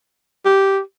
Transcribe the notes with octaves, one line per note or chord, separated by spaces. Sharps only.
G4